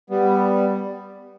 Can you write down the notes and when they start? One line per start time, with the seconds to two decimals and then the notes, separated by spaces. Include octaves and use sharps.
0.10 G3 B3